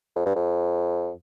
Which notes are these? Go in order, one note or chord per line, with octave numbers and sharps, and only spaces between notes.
F2
G2
F2